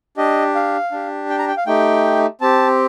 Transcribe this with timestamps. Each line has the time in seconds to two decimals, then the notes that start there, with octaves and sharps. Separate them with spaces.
0.17 D4 G4 D#5
0.55 F5
0.92 D4 G4
1.30 G5
1.39 A#5
1.48 G5
1.57 F5
1.66 A3 D#4 G4 G5
2.41 C4 G4 A5